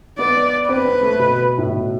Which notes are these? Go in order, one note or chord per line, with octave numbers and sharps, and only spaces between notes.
B3 D5
C4 B4
C4
A3
B2
A2
B2